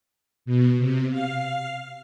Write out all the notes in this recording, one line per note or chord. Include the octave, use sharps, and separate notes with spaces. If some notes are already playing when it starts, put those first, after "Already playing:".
B2
C3
F5